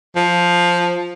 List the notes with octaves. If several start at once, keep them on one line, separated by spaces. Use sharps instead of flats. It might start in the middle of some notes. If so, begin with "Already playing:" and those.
F3